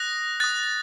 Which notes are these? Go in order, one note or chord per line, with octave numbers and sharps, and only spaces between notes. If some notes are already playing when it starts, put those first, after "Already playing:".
Already playing: D#6 F#6 A#6
D#6 F#6 A6